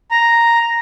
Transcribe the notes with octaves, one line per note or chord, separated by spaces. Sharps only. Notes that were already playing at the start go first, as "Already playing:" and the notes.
A#5